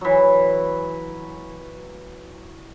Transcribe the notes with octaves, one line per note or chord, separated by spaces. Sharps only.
E3 F#3